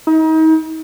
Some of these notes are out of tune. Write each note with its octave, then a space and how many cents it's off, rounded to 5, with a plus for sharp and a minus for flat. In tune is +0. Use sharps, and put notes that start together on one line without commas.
D#4 +35